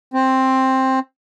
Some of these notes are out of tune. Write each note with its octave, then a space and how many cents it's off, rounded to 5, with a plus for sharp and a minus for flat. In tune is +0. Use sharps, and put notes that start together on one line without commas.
C4 +10